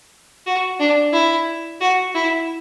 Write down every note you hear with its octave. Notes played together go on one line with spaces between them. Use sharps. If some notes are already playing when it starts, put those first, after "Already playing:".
F#4
D4
E4
F#4
E4